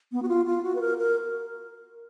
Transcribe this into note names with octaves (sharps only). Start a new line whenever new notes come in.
B3
F#4
F4
F4
F#4
B4
A#4
A#4